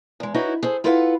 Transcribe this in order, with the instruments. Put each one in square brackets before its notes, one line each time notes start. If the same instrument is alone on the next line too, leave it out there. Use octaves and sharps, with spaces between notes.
[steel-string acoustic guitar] E2 G#3
D#4 E4 F#4 B4 C#5
G#4 A4 C5
E4 F4 A4 B4 F5 F#5